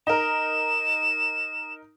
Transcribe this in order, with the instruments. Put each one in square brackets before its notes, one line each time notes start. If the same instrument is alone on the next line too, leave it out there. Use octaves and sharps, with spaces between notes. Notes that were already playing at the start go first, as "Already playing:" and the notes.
[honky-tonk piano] D#4 A#4 [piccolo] E7